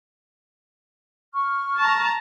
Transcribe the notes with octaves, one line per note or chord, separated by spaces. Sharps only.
C#6 F6
A5 A#5